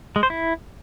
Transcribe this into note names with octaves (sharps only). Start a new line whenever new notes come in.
G#3
C5
E4